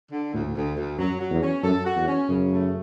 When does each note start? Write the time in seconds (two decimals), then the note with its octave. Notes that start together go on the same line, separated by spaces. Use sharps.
0.11 D3
0.33 D2 A2
0.55 D2
0.77 D2
0.99 F#2 F#3
1.20 F#3
1.31 E2
1.42 C#4
1.63 F#2 A4
1.85 F#4
1.96 E2
2.07 C#4
2.29 F#2 C#3
2.50 A3